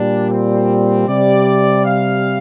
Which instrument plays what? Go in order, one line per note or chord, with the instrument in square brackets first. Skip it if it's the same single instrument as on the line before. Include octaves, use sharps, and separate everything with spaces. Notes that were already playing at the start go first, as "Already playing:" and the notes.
Already playing: [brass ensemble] A#2 G3 D4
C4
C3 G3 D5
F5